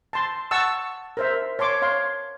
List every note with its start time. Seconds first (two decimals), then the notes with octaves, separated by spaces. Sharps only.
0.13 A5 C6
0.51 F#5 A5 C#6 E6
1.17 A#4 C5 E5
1.59 C#5 A5 C6 D6
1.82 C#5 F5 C6